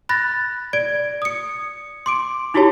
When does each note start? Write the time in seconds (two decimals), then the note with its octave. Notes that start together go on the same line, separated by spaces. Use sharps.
0.09 B5 F#6 A6 A#6
0.73 D5 G#6 D7
1.22 D#6 C#7
2.06 C6 D6 D7
2.54 D#4 E4 F#4 G4 C#5 A5